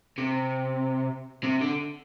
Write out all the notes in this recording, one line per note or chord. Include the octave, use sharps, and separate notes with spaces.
C3
C3
D3